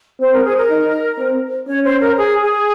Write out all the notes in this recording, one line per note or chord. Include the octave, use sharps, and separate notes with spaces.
C4 C5
A#4
G#4
A#4
D#4
C4
C#4 C#5
C5
A#4
G#4
G#4